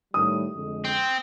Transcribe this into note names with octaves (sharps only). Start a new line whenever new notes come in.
A2 D#3 G3 D#6
F2 D3 G#3
C4